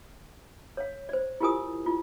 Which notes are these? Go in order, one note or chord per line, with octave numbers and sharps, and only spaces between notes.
C#5 F5
C5 D5
E4 F4 G4 A#4 G#5 D#6
E4 F4